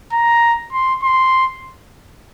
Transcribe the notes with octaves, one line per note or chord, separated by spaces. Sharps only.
A#5
C6
C6